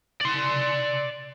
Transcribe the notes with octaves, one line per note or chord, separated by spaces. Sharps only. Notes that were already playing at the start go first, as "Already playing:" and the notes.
D5 C6